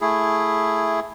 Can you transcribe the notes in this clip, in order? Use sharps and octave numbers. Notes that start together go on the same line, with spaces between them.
A3 E4 G#4